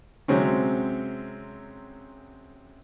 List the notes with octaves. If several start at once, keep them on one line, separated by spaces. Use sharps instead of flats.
C3 F#3 G#3 C4 C#4